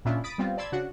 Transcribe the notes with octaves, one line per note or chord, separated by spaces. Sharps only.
A#2 C#3 D4 E4 F4
B5 D#6 A6 B6 D7
G3 B3 C4 F4
D5 A5 B5 C6 E6 G#6
C#3 D4 F#4 F#5